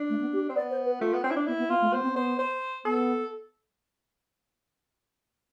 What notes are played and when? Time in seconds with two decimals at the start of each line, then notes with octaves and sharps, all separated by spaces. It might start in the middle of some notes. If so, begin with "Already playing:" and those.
Already playing: D4
0.10 A3
0.21 B3
0.33 G4
0.50 C4
0.55 B3 D5
0.71 C5
0.86 B4
1.01 A3 F4
1.13 B3
1.24 C4
1.31 E4
1.36 D4
1.47 B3 E4
1.59 B3
1.70 B3 F4
1.81 A3
1.93 B3 C5
2.03 C4
2.12 B3 C5
2.39 C5
2.85 B3 A4